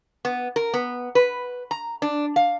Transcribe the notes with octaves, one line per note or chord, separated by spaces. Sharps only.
B3
A#4
B3
B4
A#5
D4
F5